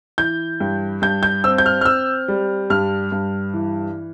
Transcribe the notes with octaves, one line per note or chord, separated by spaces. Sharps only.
E3 G6
G2
G2 G6
G6
C4 E6
G6
F6
F6
C4 E6
G3
G2 F6
G2
E3